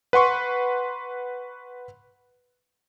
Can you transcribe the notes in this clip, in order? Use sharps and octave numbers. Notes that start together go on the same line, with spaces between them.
B4 F#5 C6 C#6